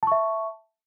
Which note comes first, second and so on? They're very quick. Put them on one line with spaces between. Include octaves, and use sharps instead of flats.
A5 C#6 E5